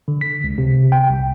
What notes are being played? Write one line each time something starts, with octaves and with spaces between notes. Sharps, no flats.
D3
B6
C#2
C3
G5
C2